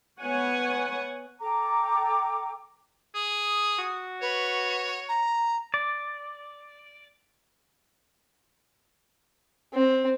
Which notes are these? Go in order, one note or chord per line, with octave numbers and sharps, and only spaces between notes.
B3 C#5 F#5 G#5
A4 G5 A#5 D6
G#4 D#6
F#4
B4 C#5
A#5
D5
C4